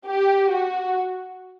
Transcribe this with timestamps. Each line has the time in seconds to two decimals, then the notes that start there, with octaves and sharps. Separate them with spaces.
0.08 G4
0.52 F#4